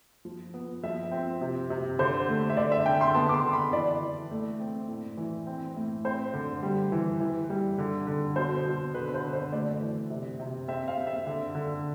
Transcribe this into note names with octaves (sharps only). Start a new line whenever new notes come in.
F3
B3
F3 E5
C4
C3
C3
D3 C5
A3
E5
D3 D5
E5
D3 G5
C6
B3 A5
D6
C6
D3
B5
E3 D5
E3
A3
C4
A2
E3
C4
A2
C4 C5
D3
G3
E3
E3
G3
D3
D3
B2 C5
B2
D3 B4
C5
D3
C5
A3 D5
E3
C3
C3
C4 E5
F5
C4
E5
D3
D3